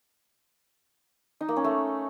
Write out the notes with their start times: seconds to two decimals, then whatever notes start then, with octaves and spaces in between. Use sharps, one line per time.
1.41 D#4
1.49 A#3
1.56 C#4
1.64 A3